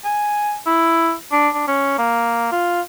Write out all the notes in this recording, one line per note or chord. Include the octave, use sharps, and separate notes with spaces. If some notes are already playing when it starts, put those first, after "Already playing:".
G#5
E4
D4
D4
C#4
A#3
F4